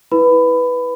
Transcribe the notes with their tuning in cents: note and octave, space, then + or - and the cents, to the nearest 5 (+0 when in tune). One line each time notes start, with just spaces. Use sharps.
E4 -15 B4 +0 B5 +20